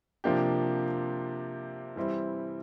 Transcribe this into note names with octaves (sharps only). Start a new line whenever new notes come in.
C3 F3 A#3 D4 G4
E3 G3 C4 E4